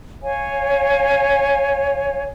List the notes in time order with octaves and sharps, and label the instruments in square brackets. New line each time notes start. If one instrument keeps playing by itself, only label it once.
[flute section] C#5 F5 G#5